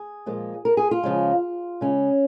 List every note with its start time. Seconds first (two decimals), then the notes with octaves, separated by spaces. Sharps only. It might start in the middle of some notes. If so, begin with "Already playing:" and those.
Already playing: G#4
0.26 A#2 F3 G#3
0.65 A#4
0.77 G#4
0.91 F4
1.03 C#3 F3 G#3
1.81 C#3 G#3 C#4